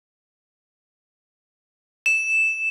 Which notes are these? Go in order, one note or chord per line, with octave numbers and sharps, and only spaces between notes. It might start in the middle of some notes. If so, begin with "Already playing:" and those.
E7